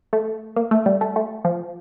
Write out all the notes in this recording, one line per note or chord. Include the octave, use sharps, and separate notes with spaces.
A3
A#3
A3
G3
A3
A3
F3